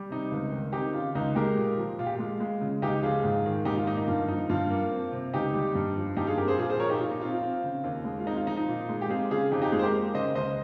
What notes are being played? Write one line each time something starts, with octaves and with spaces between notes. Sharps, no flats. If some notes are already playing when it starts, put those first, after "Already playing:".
Already playing: G3
C3 D#4
C#2
D#3
C4 D#4 G4
C#3 F4
C#2 D#4
G#3 G4 A#4
A#2
F3
A#2 F4
G4
G#3 F4
G#3
C#3
C#2 D#4 G4
F3 F4 G#4
G#2
D#3
G#2 D#4 G4
F4
A#3 D#4
D#4
G2 F4
F3 D#4
G2 F4
A#3
C4
C3
C#2 D#4 G4
G3
G2
F3
G2 D#4 G4
F4 G#4
C4 G4 A#4
G#4 C5
A#2 F4 G#4
G#4 C5
F3 A#4 C#5
D#4 G4
A#2 F4
D#4
C4 F4
F4
C4
C#3
D#2
G#3
F4
C4 D#4
F4
F3 D#4
D#4
A#2
G#3
G4
C4 F4 G#4
C#3 F4 G#4
F2 D#4 G4
D#4 G4
G#3 F4 G#4
C5
G4 A#4
A#3
C#3 C5 D#5
C#2 C5 D#5